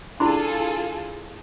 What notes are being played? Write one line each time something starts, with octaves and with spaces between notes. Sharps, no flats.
D4 E4 F4 G#4 A4 B5 C6